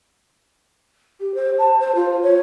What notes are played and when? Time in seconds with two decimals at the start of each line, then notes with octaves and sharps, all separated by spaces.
1.20 G4
1.34 C5
1.58 A5
1.79 C5
1.95 F4
2.22 C#5